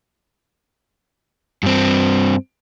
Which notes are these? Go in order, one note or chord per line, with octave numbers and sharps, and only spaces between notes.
G2 C4